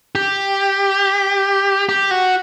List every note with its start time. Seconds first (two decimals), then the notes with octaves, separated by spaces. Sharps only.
0.15 G4
1.89 G4
2.11 F#4